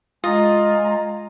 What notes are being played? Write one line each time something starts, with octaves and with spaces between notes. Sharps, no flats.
G#3 F4 D#5 G#5 A#5